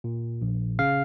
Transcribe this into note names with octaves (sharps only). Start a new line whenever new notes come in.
A#2
A#1
C#3 F5